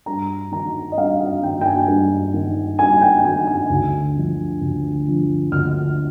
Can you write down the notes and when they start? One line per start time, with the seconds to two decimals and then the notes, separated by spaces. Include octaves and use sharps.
0.06 G2 A#5
0.51 D#3 A#5
0.92 D#5
0.97 G2 F5
1.20 F5
1.42 D#3 G5
1.61 G5
1.66 G#5
1.88 G2
2.34 D#3
2.79 G2 G#5
3.01 G5
3.25 D#3 G#5
3.47 G#5
3.70 D2
4.16 D3 F3
4.61 D2
5.06 D3 F3
5.51 D2 F6